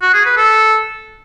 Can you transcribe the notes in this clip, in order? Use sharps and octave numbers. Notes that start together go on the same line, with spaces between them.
F#4
G#4
B4
A4